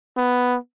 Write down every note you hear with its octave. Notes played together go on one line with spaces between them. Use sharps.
B3